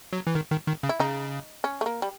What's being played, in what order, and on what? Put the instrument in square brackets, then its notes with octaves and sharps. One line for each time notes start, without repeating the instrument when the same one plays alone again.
[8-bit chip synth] F#3
E3
D#3
D#3
D#3
C#3
[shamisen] E4
[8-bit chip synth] C#3 [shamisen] D#4
[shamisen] C#4
A3
A#3
G3